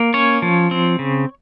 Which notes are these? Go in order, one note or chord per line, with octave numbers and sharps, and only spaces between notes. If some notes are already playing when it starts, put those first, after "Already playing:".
Already playing: A#3
C#4 C#5
F3
C4
C#3